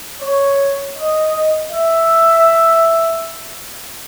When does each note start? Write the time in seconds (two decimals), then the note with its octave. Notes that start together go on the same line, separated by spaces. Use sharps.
0.21 C#5
0.96 D#5
1.71 E5